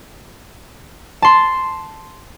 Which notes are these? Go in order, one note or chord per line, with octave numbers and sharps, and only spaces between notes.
A5 C6